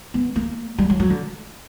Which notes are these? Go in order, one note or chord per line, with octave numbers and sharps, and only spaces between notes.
B3
A#3
G3
F#3
F#3
D3